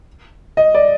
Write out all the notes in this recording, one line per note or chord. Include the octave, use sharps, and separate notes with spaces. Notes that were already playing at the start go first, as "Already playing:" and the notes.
D#5
D5